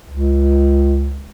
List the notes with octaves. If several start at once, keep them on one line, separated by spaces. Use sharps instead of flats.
C#2